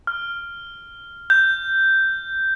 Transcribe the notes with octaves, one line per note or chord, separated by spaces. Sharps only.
F6
G6